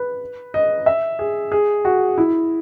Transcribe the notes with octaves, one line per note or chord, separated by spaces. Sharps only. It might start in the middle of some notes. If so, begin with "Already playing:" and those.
Already playing: B4
D#5
E5
G#4
G#4
F#4
E4